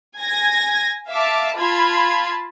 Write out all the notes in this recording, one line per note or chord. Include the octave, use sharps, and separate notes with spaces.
G#5 G#6 A#6
E5 F5 A5 D6
F4 A5 B5 G#6